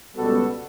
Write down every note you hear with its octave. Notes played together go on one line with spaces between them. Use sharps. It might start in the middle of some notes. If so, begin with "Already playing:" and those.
C#2 B2 G3 B3 F#4 A4